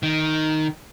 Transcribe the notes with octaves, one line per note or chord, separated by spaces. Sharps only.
D#3